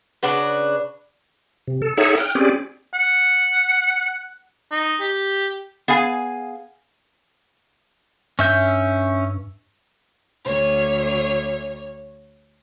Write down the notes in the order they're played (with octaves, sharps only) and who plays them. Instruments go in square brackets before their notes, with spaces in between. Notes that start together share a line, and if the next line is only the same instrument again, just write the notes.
[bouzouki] C#3 D4 F#4 B4
[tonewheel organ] C3
A4
D#4 G#4 A4 C#5 E5 F#5
G5 F6 F#6
C4 C#4 G4 G#4 D5
[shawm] F#5
D#4
G4
[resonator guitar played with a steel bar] B3 G#4 F5 G#5
[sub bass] G2 [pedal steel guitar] C#4 E5 G6
[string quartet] D2 C#5